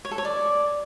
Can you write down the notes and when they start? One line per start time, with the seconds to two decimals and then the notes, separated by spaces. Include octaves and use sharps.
0.05 C#5
0.11 A4
0.18 C#5
0.25 D5